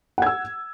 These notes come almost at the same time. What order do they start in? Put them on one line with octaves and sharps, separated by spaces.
F#5 G#6 E6